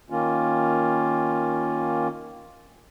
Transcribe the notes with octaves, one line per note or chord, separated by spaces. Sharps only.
D#3 A#3 C#4 F4